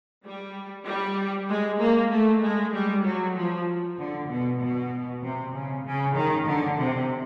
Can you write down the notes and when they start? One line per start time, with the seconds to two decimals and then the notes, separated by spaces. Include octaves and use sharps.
0.25 G3
0.86 G3
1.49 G#3
1.80 A#3
2.11 A3
2.42 G#3
2.74 G3
3.05 F#3
3.36 F3
3.98 D3
4.29 B2
4.60 B2
5.22 C3
5.54 C#3
5.85 C#3
6.15 D#3
6.47 D3
6.79 C3